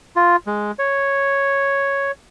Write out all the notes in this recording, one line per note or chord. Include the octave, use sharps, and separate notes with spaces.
F4
G#3
C#5